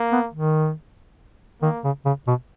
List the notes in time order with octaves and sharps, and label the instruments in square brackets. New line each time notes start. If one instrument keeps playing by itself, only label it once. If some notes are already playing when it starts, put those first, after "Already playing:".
Already playing: [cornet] A#3
[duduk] B3
D#3
[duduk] D#3 [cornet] A#3
[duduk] C#3
C#3
B2